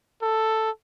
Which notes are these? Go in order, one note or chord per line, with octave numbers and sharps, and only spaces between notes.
A4